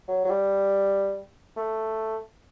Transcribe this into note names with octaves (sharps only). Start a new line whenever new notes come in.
F#3
F#3
G3
A3